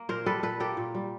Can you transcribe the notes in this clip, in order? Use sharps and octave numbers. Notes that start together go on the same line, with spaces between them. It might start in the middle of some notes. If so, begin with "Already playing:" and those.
Already playing: A#3
A#2 A#4 C5
G3 A4 B4
A#2 A4 B4
A#3 G4 A4
A#2
G3